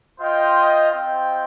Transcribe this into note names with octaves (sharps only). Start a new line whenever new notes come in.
F4 C5 D#5 G5
C4 F4 C5 D#5 G5